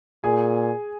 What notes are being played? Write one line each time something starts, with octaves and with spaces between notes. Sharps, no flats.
A#2 G#4 G#5